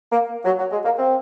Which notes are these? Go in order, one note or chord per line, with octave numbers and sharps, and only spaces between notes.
A#3
F#3
F#3
G#3
A#3
C4